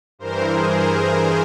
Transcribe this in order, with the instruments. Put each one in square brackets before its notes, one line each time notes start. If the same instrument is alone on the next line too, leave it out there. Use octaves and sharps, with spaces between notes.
[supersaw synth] G2 E3 A#4 C5
G#4 A#4
G#4 A#4